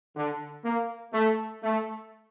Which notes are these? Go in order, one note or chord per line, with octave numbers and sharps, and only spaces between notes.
D3
A#3
A3
A3